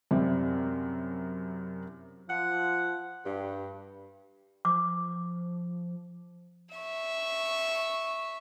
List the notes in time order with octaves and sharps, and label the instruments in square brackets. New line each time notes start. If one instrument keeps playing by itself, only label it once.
[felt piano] F#2 C3 G3 C4 E4
[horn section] F3 F#5
G2
[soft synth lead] F3 [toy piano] D6
[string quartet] E5 C#6